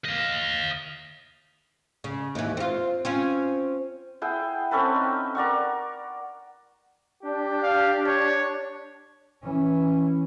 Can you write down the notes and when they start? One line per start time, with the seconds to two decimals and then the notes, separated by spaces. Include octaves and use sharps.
0.05 D#5 F5
2.04 C#3
2.35 D#2 E3
2.57 C4 F4
3.05 C4 C#4 F4
4.22 E4 G#4 F#5 G5
4.71 C4 C#4 A4 B4
4.95 D#4
5.35 A#4 D5 F#5 C#6
7.23 D4 G4
7.63 F5
8.06 C#5
9.43 E3 C#4